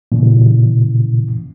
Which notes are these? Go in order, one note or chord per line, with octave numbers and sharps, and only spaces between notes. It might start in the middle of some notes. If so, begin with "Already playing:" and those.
A#2 C#3 E3